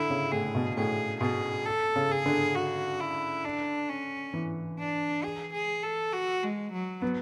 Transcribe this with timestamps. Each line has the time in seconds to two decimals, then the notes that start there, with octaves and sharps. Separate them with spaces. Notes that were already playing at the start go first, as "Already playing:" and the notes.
Already playing: D3 E4
0.10 C#3
0.32 A2 G#4
0.55 B2
0.76 A2 G#4
1.21 B2 G#4
1.66 A4
1.96 C#3
2.11 G#4
2.26 D3
2.55 F#4
3.00 E4
3.45 D4
3.89 C#4
4.34 E3
4.79 D4
5.24 G#4
5.54 G#4
5.83 A4
6.13 F#4
6.43 G#3
6.73 F#3
7.02 B3